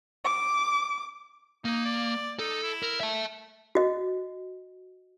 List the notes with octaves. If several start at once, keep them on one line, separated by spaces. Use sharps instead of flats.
D6
A#3 D#4
D5
D#4 A4
E4
A#4
E5 A5
F#4 D#5